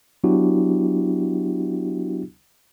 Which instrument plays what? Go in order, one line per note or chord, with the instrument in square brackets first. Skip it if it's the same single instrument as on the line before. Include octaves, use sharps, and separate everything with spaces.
[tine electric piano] F#3 B3 D4 E4 F#4 G4